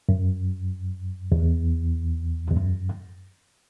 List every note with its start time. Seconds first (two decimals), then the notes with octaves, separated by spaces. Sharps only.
0.09 F#2
1.32 E2
2.51 E2
2.56 F#2